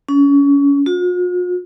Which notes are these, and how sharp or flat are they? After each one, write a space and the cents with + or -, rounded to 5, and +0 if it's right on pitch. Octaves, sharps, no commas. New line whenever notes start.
C#4 +30
F4 +45